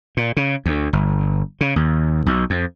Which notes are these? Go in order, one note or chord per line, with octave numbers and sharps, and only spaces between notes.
A#2
C#3
D2
G1
C#3
D#2
B1
F2